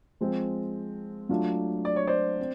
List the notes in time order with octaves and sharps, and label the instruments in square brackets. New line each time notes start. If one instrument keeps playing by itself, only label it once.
[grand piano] F3 G#3 C4
F#3 A3 D4 F4
[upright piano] D5
C#5
C5 D5
[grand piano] C4